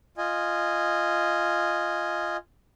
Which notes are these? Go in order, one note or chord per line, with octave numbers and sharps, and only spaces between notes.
F4 D#5 G#5